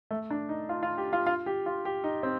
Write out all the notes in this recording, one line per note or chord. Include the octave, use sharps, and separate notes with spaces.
A3
D4
D#4
F4
F4
G4
F4
F4
G4
F4
G4
D#4
C4